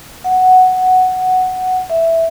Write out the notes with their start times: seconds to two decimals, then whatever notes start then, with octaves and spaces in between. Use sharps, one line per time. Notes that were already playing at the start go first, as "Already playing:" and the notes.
0.24 F#5
1.90 E5